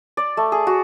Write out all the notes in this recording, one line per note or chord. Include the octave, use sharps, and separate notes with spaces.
D5
A3
G#4
F#4